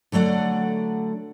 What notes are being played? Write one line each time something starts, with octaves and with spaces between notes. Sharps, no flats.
D3 F#3 A3 D5 F#5